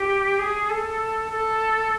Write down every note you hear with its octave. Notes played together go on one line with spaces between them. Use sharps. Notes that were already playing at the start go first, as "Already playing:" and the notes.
Already playing: G4
G#4
A4
A4